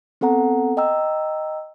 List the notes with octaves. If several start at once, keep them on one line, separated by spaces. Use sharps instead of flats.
B3 C4 A4 F#5 A#5
D#5 G5 A#5 E6